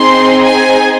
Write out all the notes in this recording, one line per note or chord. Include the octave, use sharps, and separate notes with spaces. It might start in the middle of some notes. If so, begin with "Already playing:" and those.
Already playing: C4 D#4 G#4 C6
G#5